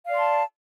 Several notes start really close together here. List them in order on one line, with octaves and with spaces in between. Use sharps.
F5 D5 C6 A5